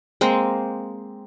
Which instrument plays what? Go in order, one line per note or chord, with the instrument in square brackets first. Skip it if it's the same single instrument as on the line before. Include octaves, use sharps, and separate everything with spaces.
[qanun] G#3 A#3 C4